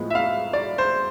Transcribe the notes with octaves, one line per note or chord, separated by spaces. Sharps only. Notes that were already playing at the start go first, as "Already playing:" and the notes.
Already playing: A2 F3 G#3 B3
E5
F5
D5
C5